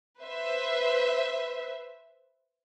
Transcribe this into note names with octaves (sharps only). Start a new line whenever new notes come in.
B4 C5 E5